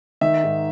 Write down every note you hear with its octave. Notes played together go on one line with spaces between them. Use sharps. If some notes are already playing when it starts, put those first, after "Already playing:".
D#3 E5
G#2